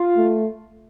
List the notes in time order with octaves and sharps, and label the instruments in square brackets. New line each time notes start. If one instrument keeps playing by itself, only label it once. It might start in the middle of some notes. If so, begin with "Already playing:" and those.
Already playing: [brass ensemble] F4
[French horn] A3